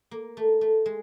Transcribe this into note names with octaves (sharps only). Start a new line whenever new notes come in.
A#3
A3
A3
G#3